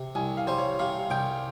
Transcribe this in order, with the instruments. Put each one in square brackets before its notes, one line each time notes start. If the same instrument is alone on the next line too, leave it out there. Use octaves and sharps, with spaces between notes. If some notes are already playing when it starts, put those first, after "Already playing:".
Already playing: [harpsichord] C3
[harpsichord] C2 [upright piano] G#5
[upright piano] F5
[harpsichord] G3 [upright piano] C5
[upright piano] C#5
[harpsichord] C3 [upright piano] F5
[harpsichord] C2 [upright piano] G5